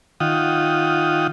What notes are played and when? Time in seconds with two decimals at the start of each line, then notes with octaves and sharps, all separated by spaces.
0.20 D#3 F4 F#5 G5 D#6